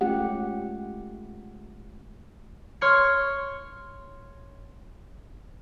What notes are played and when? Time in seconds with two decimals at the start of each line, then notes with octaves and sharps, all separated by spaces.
0.01 G#3 A3 C#4 F4 G4 F#5
2.81 C#5 C6 F6 G#6 C#7